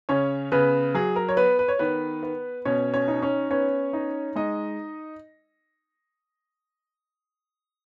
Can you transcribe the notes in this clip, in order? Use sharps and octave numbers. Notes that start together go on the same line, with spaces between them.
C#3 C#4 C#5
C#3 B3 B4
F#3 G#4
A#4
C#5
B3 B4
B4
C#5
D#3 B3 B4
B3
B2 C#4 C#5
C#4 C#5
D#4
C#4 C#5
B3 C#4 C#5
D#4
G#3 D#4 D#5